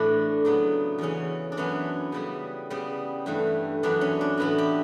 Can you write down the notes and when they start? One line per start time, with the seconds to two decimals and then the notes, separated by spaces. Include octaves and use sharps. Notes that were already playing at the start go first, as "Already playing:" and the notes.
Already playing: A2 E3 A3 D4 E4
0.45 C#3 F#3 B3
0.98 E2 C#3 E3 C#4
1.52 D4
1.57 F#2 E3 B3 C#4
2.12 C#3 G3 B3
2.70 C#3 G3 B3
3.26 G2 E3 A3
3.83 F#2 E3 B3 D4
4.01 C#4
4.21 D4
4.37 A2 E3 B3 E4
4.58 G4